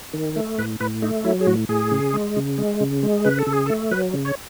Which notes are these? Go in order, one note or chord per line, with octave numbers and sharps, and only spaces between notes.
D#3
A3
A2 B4
A2 B4
A3 D#4
F#3 E4
G#4
A2 F#4
A2 G#4
C#3
G#3
C#3
G#3
C#3
G#3
C#3 B4
A4
C#3
G#4
A4
A3
F#3 B4
C#3
C#5